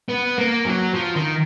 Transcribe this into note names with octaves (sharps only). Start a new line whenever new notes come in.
B3
A#3
F#3
F3
D#3